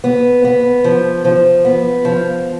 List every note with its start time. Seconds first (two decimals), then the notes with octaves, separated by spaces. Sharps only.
0.04 B3
0.44 B3
0.84 F3
1.25 F3
1.65 B3
2.05 F3